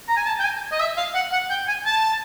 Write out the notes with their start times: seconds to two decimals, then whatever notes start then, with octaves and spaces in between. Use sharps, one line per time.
0.08 A#5
0.17 G#5
0.27 A5
0.39 G5
0.44 G#5
0.72 D#5
0.80 E5
0.97 F5
1.14 F#5
1.32 F#5
1.50 G5
1.68 G#5
1.86 A5